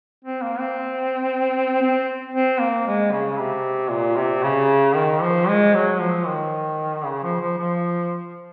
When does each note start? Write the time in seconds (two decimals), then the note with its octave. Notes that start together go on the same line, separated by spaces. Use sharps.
0.24 C4
0.42 A#3
0.59 C4
1.82 C4
2.34 C4
2.60 A#3
2.87 G#3
3.12 C#3
3.38 C3
3.91 A#2
4.17 C3
4.43 C#3
4.95 D#3
5.22 F3
5.48 G#3
5.75 F#3
6.00 F3
6.27 D#3
7.05 C#3
7.23 F3
7.40 F3
7.58 F3